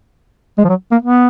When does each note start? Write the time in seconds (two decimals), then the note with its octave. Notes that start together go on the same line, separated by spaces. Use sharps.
0.58 G#3
0.64 F3
0.69 F#3
0.91 A#3
1.02 B3